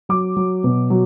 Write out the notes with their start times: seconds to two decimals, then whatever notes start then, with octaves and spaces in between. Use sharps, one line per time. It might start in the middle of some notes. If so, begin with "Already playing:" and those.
0.09 F#3 D6
0.36 F#3
0.64 B2
0.90 F#3